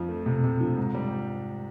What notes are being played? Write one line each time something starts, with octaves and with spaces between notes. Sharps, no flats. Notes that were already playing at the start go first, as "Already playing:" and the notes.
Already playing: F2 F3
A3
C3
C3
F3
G#2
G3